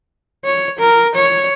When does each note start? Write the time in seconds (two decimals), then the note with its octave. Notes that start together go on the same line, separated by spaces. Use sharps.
0.45 C#5
0.79 A#4
1.15 C#5